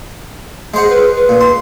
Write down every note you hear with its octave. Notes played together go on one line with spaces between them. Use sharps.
G#3 G#4 C5 F#5
B4
B4
A#2
C6